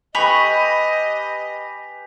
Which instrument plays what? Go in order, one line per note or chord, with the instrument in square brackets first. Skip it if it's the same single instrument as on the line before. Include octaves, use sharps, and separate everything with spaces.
[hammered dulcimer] G4 B4 [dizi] D#5 [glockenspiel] G#5 B6 F7 [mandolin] B5 C#6